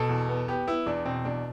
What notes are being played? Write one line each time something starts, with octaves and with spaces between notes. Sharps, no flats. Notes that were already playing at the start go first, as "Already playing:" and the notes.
Already playing: B2 A4
E2
B3
B3 G4
B3 E4
E2 D4
B2 C4
E2 D4